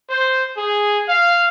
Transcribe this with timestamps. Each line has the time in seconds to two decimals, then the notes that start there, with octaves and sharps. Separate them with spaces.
0.10 C5
0.57 G#4
1.09 F5